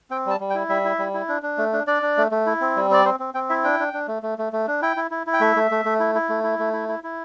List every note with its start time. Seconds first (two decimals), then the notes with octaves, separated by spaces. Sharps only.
0.10 C4 G5
0.26 G3 A5
0.40 G3
0.50 G5
0.55 E4
0.69 G3 E5
0.85 E4
0.99 G3
1.14 E4
1.29 D4
1.43 D4
1.58 A3
1.73 D4
1.87 D4 D5
2.02 D4
2.17 A3
2.31 A3
2.46 E4
2.61 C4
2.76 G3
2.91 C4 D5
3.05 C4 C5
3.20 C4
3.34 C4 G5
3.49 E4 E5
3.64 D4 G5
3.80 D4
3.93 D4
4.08 A3
4.23 A3
4.38 A3
4.53 A3
4.67 D4
4.82 E4 G5
4.97 E4
5.11 E4
5.27 E4
5.34 G5
5.41 A3 E5
5.56 A3
5.71 A3
5.85 A3
6.00 E4
6.15 E4
6.29 A3
6.43 E4
6.59 A3
6.73 E4
6.89 E4
7.04 E4